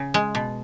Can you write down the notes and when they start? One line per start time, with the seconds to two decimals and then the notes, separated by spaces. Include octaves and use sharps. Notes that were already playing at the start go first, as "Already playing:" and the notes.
Already playing: C#3
0.14 G#3
0.35 B2